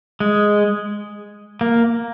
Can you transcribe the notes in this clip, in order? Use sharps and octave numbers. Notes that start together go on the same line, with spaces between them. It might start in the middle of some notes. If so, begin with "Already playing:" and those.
G#3
A#3